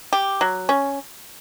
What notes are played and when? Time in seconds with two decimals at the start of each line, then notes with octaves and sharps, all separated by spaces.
0.13 G4
0.41 F#3
0.69 C#4